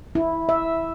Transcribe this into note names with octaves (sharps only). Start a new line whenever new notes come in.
E4
E5